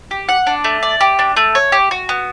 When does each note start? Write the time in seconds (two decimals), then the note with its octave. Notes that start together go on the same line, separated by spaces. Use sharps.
0.11 G4
0.29 F#5
0.47 D4
0.64 A3
0.83 D5
1.01 G4
1.19 D4
1.37 A3
1.55 C#5
1.72 G4
1.91 F#4
2.09 B3